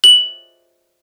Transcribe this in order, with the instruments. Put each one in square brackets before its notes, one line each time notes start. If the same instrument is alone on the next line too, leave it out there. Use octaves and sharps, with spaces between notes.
[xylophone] F#7